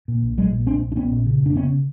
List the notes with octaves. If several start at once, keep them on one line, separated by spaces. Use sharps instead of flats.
A#2
A#1
A#1 F#3 G#3
A#2
A#1 C4 D4
A#1
D4
A#1 B3 C#4
A#2
C#3
F1 D4
C#3 B3 C#4